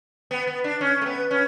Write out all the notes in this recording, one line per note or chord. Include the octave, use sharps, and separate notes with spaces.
B3
B3
D4
C#4
A3
B3
C#4